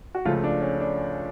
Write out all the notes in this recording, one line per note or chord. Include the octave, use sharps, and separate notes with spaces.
F#4
C#2 C#3 F3 A3 F4
D4
C#4
D4